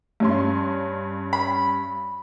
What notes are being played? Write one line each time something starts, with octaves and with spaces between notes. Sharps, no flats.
G2 C#4 C6
B5